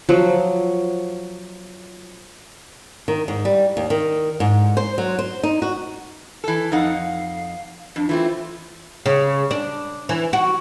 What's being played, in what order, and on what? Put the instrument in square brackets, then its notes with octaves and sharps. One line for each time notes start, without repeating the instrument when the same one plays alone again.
[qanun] F3 F#3
[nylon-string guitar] D#3
G#2
G3
D#2
D#3
G#2
C5
F#3
C5
D#4
F#4
[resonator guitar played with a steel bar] E3 A4
[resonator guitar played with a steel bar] F2 D#4 F#5 [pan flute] F5
[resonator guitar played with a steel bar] F2 [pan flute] D4
[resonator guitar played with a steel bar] E3 A3 C4 [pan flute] F4
[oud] C#3
D4
E3
F#4